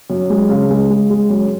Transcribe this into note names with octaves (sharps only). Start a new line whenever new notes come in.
F#2
G#3
C#3
G#3
G#3
G#3
F#2